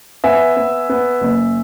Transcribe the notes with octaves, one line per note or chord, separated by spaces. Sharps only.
B3 E5 G#5
B3
B3
F#1